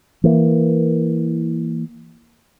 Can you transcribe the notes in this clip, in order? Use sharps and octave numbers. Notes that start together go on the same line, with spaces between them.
E3 A#3